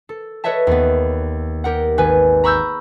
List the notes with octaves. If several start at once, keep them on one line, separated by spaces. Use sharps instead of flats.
A4
A4 B4 C#5 D#5 E5 A5
D#2 B3
G4 A#4 F#5
G#1 B4 G#5
A#5 B5 C#6 E6 F6 G6